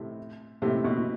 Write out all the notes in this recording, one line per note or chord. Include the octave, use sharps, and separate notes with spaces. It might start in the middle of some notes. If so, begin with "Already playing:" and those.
Already playing: A2 C3
A2 C3
B2